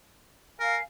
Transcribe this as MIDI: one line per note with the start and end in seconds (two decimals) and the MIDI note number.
0.60 0.77 70
0.60 0.81 77
0.60 0.81 80